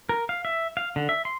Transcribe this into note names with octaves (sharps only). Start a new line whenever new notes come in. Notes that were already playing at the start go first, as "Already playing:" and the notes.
A#4
F5
E5
F5
D3
E5
C6